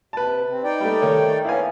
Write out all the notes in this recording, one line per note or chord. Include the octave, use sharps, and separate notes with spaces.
C3 B4 A5
C4
D#4 D5 G5
G3 A3
D#3 A3 C#5
B3 C#4 E4 F5 G#5